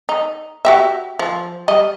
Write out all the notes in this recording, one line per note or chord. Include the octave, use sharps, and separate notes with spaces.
D#4
F#4 G4 E5
F3
G3 D#5